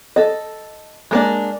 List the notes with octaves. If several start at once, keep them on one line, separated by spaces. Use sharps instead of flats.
A4 D#5
G#3 A#3 D4